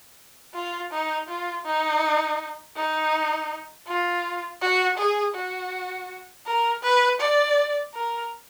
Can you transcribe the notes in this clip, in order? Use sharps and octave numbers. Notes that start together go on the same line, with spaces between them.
F4
D#4
F4
D#4
D#4
F4
F#4
G#4
F#4
A#4
B4
D5
A#4